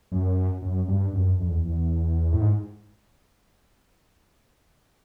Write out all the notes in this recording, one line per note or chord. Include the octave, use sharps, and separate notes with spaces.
F#2
F#2
G2
F#2
F2
E2
E2
A2
G#2